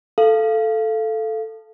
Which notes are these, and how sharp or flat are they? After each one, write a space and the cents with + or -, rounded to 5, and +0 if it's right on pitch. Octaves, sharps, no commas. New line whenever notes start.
A4 +0 F5 -15